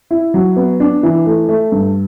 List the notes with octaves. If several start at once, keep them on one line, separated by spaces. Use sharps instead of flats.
E4
F#3
B3
D4
E3
A3
A3
G2